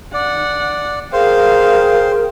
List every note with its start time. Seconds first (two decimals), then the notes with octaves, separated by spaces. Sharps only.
0.14 D5 F#5
1.13 G#4 A#4 C5 F5 G5